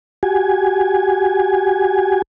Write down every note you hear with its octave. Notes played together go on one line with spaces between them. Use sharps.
F#4 G4 G#5